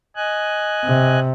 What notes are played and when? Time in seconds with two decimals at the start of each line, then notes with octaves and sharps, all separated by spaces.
0.16 D#5 G#5 F#6
0.85 C3